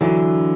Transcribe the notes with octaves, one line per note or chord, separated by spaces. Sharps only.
D3 E3 F#3